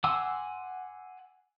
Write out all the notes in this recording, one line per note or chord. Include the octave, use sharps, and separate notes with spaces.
F#5 G#5 C6 D6 E6